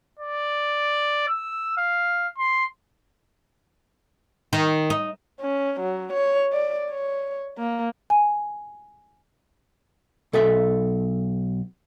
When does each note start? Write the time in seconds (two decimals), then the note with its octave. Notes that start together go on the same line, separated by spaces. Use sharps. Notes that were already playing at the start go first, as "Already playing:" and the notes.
0.19 D5
1.28 E6
1.77 F5
2.38 C6
4.53 D#3
4.90 D#4
5.40 C#4
5.80 F#3
6.13 C#5
6.53 D5
6.91 C#5
7.58 A#3
8.10 G#5
10.33 B1 A4 D#5 E5